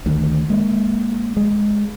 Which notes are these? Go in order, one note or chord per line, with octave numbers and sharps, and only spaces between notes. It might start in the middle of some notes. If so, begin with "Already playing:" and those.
D2 D#3
G#3 A#3
G#3